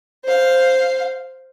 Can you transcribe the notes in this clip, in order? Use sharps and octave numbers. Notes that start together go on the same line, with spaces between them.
C5 F5